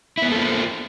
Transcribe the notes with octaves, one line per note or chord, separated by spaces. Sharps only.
A#3 B3 E4 F4 A4